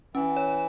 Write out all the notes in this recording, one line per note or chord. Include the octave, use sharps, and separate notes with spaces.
E3 C#4
C#5